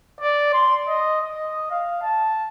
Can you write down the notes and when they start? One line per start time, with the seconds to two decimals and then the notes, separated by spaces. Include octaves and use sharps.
0.21 D5
0.53 C6
0.88 D#5
1.21 D#5
1.71 F5
2.03 A5